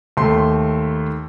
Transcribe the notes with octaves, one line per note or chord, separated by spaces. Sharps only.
D#2 A3 C6